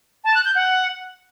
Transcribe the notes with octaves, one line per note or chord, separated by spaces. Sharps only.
A5
F#6
G6
F#5